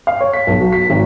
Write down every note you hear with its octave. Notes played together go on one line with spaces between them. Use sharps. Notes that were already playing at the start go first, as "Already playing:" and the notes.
F5
C#5
B6
B1
F#3
B6
G#1